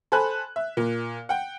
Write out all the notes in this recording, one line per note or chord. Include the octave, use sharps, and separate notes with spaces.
A4 C5 G#5 B5 F#6
E5
A#2
F#5 G5